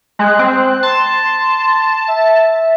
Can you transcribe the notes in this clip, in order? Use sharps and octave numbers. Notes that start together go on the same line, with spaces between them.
G#3 F#6
C4
A5 C6
E5